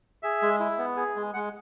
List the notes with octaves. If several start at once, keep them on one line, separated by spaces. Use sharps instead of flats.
G#4 E5
G#3
E4
B3
G#4
G#3
G#3 F#5